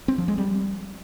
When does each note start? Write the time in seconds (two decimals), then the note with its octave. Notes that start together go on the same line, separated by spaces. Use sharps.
0.08 C4
0.18 F3
0.28 G#3
0.38 G3